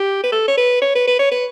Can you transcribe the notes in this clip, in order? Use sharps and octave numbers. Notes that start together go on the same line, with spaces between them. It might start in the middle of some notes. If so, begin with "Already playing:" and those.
Already playing: G4
B4
A4
C#5
B4
C#5
B4
B4
C#5
B4